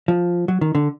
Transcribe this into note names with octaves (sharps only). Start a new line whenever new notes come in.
F3
F#3
D#3
D3